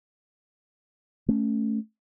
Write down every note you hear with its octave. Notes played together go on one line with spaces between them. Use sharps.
A3 C#4